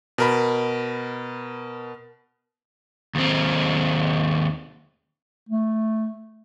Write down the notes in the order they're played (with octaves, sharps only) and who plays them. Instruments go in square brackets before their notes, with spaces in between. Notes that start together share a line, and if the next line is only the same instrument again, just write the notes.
[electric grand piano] B2 A#4 B5
[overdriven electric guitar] D#2 C4
[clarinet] A3